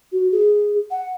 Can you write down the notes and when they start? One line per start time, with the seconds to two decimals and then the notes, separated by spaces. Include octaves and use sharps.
0.12 F#4
0.32 G#4
0.91 F#5